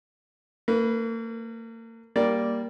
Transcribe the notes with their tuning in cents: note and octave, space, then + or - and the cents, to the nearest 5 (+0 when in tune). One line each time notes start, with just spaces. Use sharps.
A#3 -40 B4 -10
G3 +0 A#3 +0 D5 -5